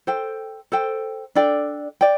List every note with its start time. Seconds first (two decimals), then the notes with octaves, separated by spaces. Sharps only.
0.07 A4 C5 G5
0.72 A4 C5 G5
1.35 D4 A4 D5 G5
2.01 D5 G5